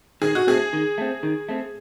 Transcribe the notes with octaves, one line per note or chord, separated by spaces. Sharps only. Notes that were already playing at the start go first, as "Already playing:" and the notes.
D#3 G#4
F#4
A3 C4 G#4
D#3
A3 C4
D#3
A3 C4